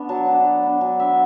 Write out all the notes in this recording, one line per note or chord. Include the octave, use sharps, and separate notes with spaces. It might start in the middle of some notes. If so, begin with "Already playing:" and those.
Already playing: B3 D4
F#3 A5
B3 D4
F#3
B3 D4
F#3 G#5
B3 D4 E5